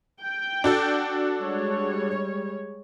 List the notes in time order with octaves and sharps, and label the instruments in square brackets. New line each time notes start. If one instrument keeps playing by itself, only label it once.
[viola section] G5
[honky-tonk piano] D4 F#4 A4
[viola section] G3 G#3 C#5